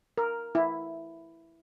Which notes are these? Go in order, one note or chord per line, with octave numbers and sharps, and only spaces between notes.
A#4
E4